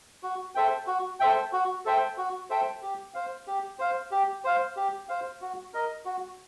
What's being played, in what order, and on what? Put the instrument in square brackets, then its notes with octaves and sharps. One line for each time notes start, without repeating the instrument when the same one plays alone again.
[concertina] F#4
A4 C5 E5 G5
F#4
A4 C5 E5 G5
F#4
A4 C5 E5 G5
F#4
A4 C5 E5 G5
G4
C5 F5
G4
C5 F5
G4
C5 F5
G4
C5 F5
F#4
A#4 D#5
F#4